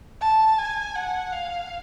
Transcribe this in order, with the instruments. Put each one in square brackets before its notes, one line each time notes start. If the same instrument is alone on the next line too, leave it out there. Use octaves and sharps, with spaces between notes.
[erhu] A5
G#5
F#5
F5